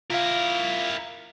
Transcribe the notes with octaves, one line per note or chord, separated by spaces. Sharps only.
E4 F4 A#4 F5